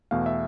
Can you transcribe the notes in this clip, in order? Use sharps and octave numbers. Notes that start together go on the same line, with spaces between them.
E2 B2 A3 F5
E5